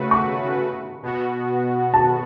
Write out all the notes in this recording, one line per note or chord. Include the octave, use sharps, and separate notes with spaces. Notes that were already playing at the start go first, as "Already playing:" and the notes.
Already playing: C#3 A3 F#4 B4
C#6
B2 B3 F#4
A5